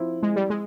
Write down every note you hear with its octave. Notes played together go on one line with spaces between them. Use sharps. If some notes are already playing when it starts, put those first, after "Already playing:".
Already playing: F3 C4 E4
G#3
G3
G#3